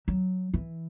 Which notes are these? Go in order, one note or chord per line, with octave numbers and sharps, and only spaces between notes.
F#3
E3